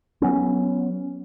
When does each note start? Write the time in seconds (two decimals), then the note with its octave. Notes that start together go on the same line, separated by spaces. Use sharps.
0.22 F#3 B3 C#4